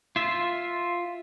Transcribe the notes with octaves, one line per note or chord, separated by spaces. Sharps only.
F4 E5